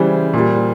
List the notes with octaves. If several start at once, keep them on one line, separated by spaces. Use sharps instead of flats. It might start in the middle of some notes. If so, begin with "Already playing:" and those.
Already playing: C#3 E3 G3 C5
A#2 G3